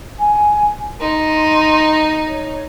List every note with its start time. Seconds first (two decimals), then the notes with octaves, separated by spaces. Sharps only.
0.19 G#5
1.01 D#4 C6
2.27 C#5